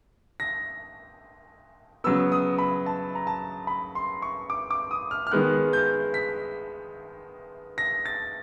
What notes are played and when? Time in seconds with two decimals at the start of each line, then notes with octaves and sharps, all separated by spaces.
0.40 A#6
2.04 C#3 F#3 B3 E6
2.32 D#6
2.58 B5
2.86 A5
3.15 A#5
3.27 A5
3.67 B5
3.95 C6
4.22 C#6
4.50 D6
4.71 D6
4.91 D#6
5.11 F6
5.27 F6
5.32 D#3 G#3 B3 F#6
5.73 G6
6.14 B6
7.78 A#6
8.06 A6